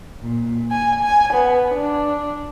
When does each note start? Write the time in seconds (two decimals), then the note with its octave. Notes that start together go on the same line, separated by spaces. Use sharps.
0.22 A#2
0.70 G#5
1.02 G#5
1.32 B3
1.75 D4